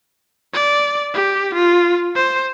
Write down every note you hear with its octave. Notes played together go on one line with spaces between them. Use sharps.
D5
G4
F4
C5